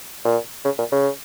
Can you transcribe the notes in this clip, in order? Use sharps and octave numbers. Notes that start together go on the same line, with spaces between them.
A#2
C#3
A#2
C#3